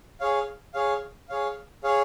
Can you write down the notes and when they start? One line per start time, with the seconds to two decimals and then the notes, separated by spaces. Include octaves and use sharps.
0.20 G#4 C#5 F5
0.74 G#4 C#5 F5
1.29 G#4 C#5 F5
1.84 G#4 C#5 F5